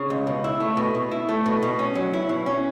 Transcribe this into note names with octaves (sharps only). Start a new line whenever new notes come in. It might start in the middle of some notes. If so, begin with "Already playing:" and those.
Already playing: C#3
C#2
B2
E4
A3
B2
B2
E4
A3
B2
B2
C#4
F#3
E4
B2
C#4